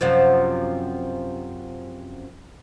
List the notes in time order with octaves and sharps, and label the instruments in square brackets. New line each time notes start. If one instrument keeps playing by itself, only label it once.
[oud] F#2 C3 F3